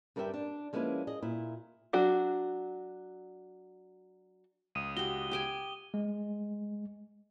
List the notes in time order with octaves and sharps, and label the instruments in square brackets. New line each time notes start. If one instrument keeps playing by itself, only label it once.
[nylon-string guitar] G2 G3 A#4 B4 E5 G5
D4
F3 G#3 A#3 C#4 E4 B4
G#4 D#5
A#2 E4
[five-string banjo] F#3 D4 F#4
[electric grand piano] C#2 [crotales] D#6 D#7
[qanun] F#4 G4 [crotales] G7
[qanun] G4 G5 G#5
[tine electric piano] G#3